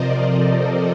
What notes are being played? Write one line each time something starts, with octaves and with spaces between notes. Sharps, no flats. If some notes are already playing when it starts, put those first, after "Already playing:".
Already playing: C3 F3 A#4 C5 D5 D#5
A4 C5